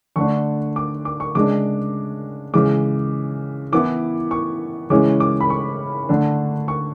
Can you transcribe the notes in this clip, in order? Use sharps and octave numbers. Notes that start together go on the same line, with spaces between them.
D3 A3 D4 C#6
D6
D6
C#6
C#3 G#3 D4 D6
C#3 E3 G#3 D6
E3 B3 E4 D6
C#6
C#3 E3 G#3 C#4 E4 D6
D6
B5
C#6
D3 A3 D4
C#6